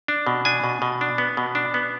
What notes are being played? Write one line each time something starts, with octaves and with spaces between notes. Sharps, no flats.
D4
B2
D4 G#5
B2
B2
D4
B3
B2
D4
B3